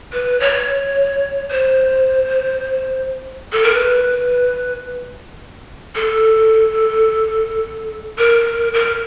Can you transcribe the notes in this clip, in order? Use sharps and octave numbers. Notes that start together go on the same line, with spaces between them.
B4
C#5
C5
A4
A#4
B4
A4
A#4
A#4